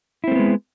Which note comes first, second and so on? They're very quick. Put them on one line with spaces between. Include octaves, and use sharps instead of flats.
E4 C4 A3 B3 G#3